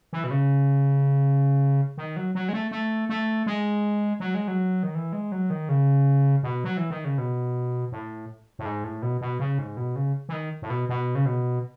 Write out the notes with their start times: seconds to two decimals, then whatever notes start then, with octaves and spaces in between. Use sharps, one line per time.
0.13 E3
0.24 B2
0.31 C#3
1.98 D#3
2.16 F#3
2.35 F#3
2.49 G#3
2.53 A3
2.71 A3
3.09 A3
3.46 G#3
4.20 F#3
4.34 G#3
4.48 F#3
4.83 D#3
4.95 E3
5.13 G#3
5.32 F#3
5.50 D#3
5.69 C#3
6.43 B2
6.64 F#3
6.77 E3
6.90 D#3
7.05 C#3
7.18 B2
7.92 A2
8.59 A2
8.65 G#2
8.84 A2
9.02 B2
9.21 B2
9.40 C#3
9.59 G#2
9.77 B2
9.96 C#3
10.29 E3
10.33 D#3
10.62 A2
10.70 B2
10.89 B2
11.15 C#3
11.26 B2